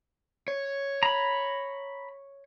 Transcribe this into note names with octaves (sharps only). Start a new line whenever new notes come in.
C#5
A#5 B5